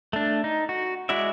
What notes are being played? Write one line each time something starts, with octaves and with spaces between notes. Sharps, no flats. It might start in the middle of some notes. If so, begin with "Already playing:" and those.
A3 D4
D#4
F#4
G#3 E4 F#4 D5 E5